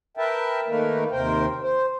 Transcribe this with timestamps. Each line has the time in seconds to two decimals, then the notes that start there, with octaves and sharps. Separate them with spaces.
0.17 A#4 B4 E5 G5 A5
0.68 D#3 A3 A#3 D#4 A#4 B4
1.11 D#2 C3 A#4 C5 G5
1.62 C5